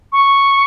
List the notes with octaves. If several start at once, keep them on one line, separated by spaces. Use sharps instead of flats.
C#6